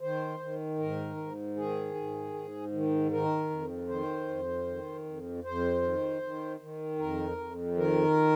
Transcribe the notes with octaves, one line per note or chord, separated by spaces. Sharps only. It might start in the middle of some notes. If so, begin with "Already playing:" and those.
D#3 C5
D#3
G#2 A#4
G#2
D#3 G#4
G#2
G#2
D#3
D#3 A#4
F2
D#3 C5
F2
D#3
F2
F2 C5
D#3
D#3
D#3
F2 A#4
F2
D#3 A#4